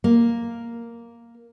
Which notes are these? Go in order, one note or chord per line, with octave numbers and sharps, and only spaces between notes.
A#3